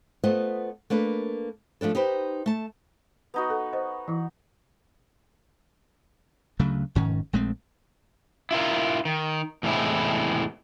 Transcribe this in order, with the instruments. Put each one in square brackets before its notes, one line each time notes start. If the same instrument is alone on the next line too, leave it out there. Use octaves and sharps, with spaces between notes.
[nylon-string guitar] A3 B3 F4 C5 D#5
A3 A#3 D4 B4
F3 A3 D4 A4
D#4 G4 B4 C5
A3 A5
[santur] B3 D#4 F#4
[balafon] A4
C5 D#5
E3 E4
[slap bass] D2 C#3 F#3 A3
F1 G#2 D#3 C#4
A#1 G#3 A3 C4
[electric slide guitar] E4 F4 A#4
D#3
E2 A2 C3 G#3 E4